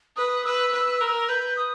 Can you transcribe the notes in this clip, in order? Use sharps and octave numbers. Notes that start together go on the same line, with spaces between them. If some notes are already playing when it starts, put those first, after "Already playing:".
B4 D#6
B4 E6
B4
A#4
B4 G6
D#6